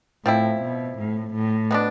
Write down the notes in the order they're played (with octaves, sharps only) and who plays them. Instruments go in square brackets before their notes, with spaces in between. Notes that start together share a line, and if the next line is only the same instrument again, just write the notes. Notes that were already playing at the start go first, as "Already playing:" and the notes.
[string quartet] A2 [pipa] F3 C4 E4
[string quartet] B2
A2
A2
[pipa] B2 B3 D4